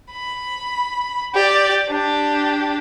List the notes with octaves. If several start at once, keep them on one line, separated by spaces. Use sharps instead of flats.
B5
G4 D5
D4 G4